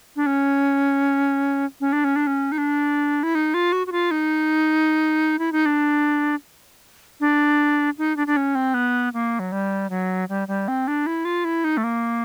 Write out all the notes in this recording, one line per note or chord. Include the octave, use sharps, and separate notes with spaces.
D4
C#4
C#4
D4
C#4
D4
C#4
D#4
D4
E4
D#4
F4
F#4
F#4
F4
D#4
E4
D#4
D4
D4
D#4
D4
D4
C#4
C4
B3
A#3
F#3
G3
F#3
G3
G3
C4
D4
E4
F4
E4
D#4
A3
A#3